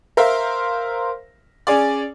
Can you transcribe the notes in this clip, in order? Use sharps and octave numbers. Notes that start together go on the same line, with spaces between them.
A#4 C5 E5 F5 C6
C#4 G#4 D5